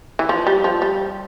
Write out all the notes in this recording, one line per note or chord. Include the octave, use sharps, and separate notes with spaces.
E3
F3
G3
F3
G3